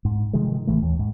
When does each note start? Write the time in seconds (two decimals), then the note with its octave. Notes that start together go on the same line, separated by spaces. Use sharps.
0.05 G#2
0.33 C3 D#3 F3 G#3
0.67 A1 E3 A3
0.82 D#2
0.99 G#2